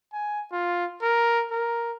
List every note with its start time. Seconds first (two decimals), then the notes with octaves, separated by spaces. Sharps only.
0.13 G#5
0.52 F4
1.02 A#4
1.51 A#4